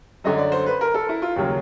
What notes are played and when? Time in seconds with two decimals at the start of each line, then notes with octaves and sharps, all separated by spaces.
0.24 F#2 D3 F#3 D#5
0.38 D5
0.52 C5
0.66 B4
0.81 A#4
0.94 A4
1.09 E4
1.22 F4
1.36 D#2 C#3 F#3 A#3